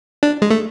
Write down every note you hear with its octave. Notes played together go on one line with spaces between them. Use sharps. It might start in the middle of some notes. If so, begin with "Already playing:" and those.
D4
G#3
A3